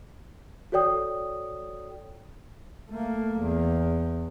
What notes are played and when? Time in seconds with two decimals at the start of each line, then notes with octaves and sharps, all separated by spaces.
0.72 F#4 A4 C#5 D5 G5 D#6
2.91 A3 A#3
3.41 E2